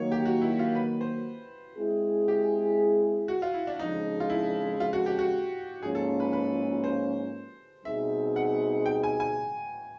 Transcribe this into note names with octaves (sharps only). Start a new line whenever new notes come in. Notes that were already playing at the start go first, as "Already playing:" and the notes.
Already playing: D#3 F#3 A#3 C#5
G4
F#4
E4
F4
B4
C5
G#3 C4 E4 G#4
G4
F#4
F4
E4
D4
F2 C#3 F3 G#3 D#4
F4
E4
F4
F#4
G4
F#4
G#2 F3 A#3 C#4 F4 G#4
A4
B4
B4
C5
B2 G3 C4 D#4 G#4 E5
F#5
G5
G#5
G#5